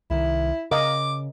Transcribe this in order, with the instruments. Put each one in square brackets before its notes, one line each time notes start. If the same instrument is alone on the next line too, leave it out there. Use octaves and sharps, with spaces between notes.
[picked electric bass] C2 D#3 [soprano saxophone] E4
[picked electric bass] C#3 [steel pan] A#4 D#5 F5 [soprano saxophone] D6